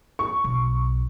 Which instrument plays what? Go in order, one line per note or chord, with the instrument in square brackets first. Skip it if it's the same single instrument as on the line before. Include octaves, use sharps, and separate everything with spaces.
[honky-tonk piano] C#6
[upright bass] B1